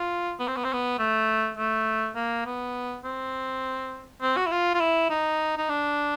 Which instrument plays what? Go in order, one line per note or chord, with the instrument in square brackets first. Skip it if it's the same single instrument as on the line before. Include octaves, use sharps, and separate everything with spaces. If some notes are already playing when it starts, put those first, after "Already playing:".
Already playing: [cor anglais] F4
B3
C4
B3
C4
B3
A3
A3
A#3
B3
C4
C4
F#4
E4
F4
F4
E4
D#4
D#4
D4